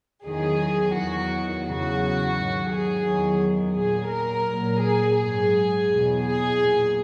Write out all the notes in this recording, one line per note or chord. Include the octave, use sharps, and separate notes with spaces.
E2 D#3 F#3 G#4
E2 D#3 F#3 F#4
E2 C#3 F#3 F#4
G#2 D#3 F#3
G#4
E2 D#3 F#3
A#2 F#3 G#4
A#4
A#2 F#3
G#4
G#2 F#3 G#4
E2 B2 F#3
G#4
A#2 F#3